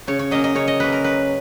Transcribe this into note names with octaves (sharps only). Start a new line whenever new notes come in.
C#3 C#5
C#5
F#3 A#3 C#4 D#5
D#5
C#3 C#5
D#5
F#3 A#3 C#4 B4
A#4
F#3 B4